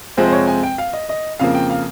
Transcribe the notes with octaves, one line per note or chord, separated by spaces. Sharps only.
F2 C3 F3 G#3 C4 C5
C5
C#5
G#5
G5
F5
D#5
D#5
F2 C#3 F3 A#3 F5
G5
F5